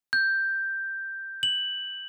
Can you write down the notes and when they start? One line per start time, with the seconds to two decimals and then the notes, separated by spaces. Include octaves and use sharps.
0.13 G6
1.43 F#7